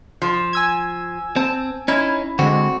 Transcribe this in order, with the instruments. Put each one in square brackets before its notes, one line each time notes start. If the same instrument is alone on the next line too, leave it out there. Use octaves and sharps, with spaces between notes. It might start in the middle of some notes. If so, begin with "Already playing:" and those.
[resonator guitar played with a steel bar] F3
[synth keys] G#5 E6 G#6
[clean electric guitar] C4 [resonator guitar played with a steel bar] A5
[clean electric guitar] C#4 D#4 [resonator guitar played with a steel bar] E4
[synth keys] D3 G#3 [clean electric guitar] C4 F#4